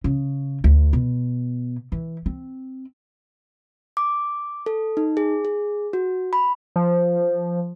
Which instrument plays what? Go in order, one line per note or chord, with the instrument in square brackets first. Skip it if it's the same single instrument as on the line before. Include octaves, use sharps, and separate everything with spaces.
[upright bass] C#3
D2
B2
E3
C4
[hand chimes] D6
A4
D#4
G#4
G#4
F#4
B5
[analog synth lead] F3